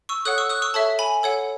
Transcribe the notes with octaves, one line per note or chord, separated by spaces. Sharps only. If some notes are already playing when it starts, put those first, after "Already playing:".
C#6 E6
A4 C#5 F#5 D#6 F#6
C#6 E6
D#6 F#6
C#6 E6
A4 C#5 E5 A5
G#5 B5
A4 C#5 F#5